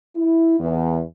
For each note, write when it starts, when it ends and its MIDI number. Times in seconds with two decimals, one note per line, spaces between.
0.16 0.59 64
0.60 1.00 40